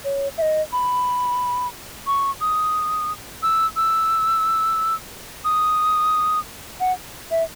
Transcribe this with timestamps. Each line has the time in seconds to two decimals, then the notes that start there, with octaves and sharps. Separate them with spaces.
0.05 C#5
0.38 E5
0.42 D#5
0.73 B5
2.07 C#6
2.41 D#6
3.43 E6
3.76 E6
5.45 D#6
6.80 F#5
7.31 E5